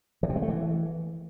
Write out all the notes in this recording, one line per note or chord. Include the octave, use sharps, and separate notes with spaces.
E3
C3
G#3
A3
E3